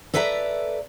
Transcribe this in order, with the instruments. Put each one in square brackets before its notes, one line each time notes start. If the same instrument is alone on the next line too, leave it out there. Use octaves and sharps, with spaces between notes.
[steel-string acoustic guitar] A4 B4 D5 E5 G5 A#5